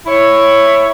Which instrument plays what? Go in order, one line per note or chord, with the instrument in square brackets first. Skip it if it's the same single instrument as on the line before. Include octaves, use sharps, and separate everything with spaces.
[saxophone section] E4 C#5